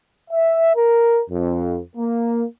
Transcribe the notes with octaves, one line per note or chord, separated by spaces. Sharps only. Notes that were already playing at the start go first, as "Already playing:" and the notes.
E5
A#4
F2
A#3